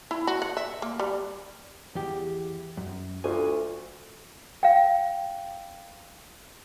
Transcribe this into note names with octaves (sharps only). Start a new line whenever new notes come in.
E4
F#4
F#5
E5
A#3
G3
E2 G4
F#2
D2 F4 G#5
F5 G5